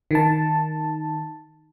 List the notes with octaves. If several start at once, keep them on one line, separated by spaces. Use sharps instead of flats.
D#3 A5